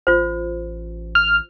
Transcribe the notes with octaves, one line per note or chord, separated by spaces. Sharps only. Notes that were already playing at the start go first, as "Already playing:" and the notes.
A1 F4 C5
F6